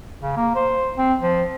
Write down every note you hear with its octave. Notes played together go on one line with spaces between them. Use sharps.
C#3
A#3
C5
C4
F3